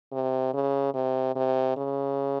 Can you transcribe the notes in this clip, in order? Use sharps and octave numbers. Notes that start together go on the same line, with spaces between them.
C3
C#3
C3
C3
C#3